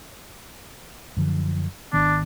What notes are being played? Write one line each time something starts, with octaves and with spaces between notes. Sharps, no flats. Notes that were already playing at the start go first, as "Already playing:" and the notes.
F#2 D3 F3
G#1 D#3 B3 D4